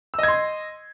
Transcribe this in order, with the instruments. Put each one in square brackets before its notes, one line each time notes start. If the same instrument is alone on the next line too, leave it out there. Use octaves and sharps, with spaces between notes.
[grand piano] E6
D#5
G#6
C6